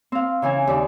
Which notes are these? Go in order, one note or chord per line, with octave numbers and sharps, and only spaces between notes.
C4 F5
C#3 E3 E4 G#5
D#2 D5